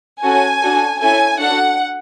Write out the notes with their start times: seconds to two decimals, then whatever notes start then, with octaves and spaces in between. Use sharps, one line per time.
0.23 C#4 F#4 A4 G#5
0.62 D4 F#4 A4
1.00 C#4 E4 A4 G#5
1.39 D4 F#4 A4 F#5